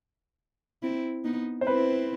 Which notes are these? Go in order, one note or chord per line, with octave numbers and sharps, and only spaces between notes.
C4 E4
B3 D#4
C5
C4 E4 B4